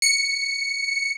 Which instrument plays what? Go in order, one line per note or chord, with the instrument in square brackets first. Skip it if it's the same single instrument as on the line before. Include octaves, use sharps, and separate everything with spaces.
[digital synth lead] C#7